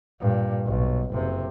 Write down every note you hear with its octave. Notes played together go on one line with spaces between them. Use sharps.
G2 A#2
B1
F#1 C3